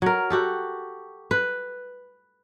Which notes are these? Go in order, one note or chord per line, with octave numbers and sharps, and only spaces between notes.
F#3 A#4
F#4 G4 A4
B4